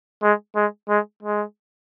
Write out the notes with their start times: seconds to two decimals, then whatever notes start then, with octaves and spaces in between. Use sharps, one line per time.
0.23 G#3
0.56 G#3
0.89 G#3
1.23 G#3